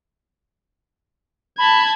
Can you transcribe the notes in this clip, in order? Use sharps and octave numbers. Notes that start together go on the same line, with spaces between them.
A5 B5 G#6